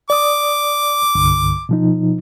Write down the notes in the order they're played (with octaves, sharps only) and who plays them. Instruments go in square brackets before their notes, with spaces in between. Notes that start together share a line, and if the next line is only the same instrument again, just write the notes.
[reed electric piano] D5 D#6 [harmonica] D6
[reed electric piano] C2 G2 D3
B2 F3 D#4